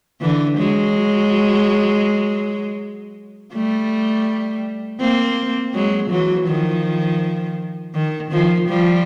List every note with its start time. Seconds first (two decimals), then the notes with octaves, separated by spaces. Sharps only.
0.21 D3 E3
0.58 F#3 G#3
3.53 G3 A3
5.00 A#3 C4
5.74 F#3 G#3
6.11 E3 F#3
6.47 D#3 F3
7.94 D#3
8.32 D#3 F3
8.68 F3 G3